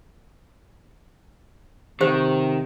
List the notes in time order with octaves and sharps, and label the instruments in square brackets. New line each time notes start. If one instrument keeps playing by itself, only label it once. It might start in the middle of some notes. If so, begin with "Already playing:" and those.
[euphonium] C3 [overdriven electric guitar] D#3 [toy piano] G4 C5